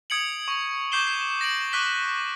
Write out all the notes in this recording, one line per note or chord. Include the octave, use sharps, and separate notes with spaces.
D#6 G#6 C#7 D7 F#7
C#6
C#6 D6 G6 C7 E7 G7
C7
A#6 D7 F#7
C#6 D6 F#6 B6 G7